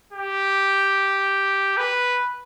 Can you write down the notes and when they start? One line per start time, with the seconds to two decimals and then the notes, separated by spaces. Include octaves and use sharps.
0.13 G4
1.77 B4